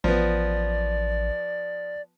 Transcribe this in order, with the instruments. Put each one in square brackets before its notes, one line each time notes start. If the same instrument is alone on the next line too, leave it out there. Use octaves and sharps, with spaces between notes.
[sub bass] A1 [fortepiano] F3 B3 [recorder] D5